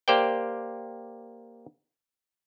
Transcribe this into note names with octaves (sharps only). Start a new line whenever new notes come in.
A#3 G4 C5 D5 G5